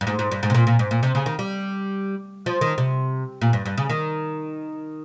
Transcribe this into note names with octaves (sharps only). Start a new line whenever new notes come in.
G2
G#2
G#2
G2
G#2
C3
A#2
A#2
G#2
A#2
C3
C#3
D#3
G3
F3
D#3
C3
A#2
G2
G2
C#3
D#3